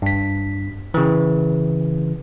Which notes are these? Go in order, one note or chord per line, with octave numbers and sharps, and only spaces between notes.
G2 B6
C#3 E3